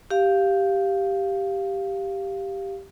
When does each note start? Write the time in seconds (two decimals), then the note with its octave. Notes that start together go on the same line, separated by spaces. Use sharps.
0.11 G4 F5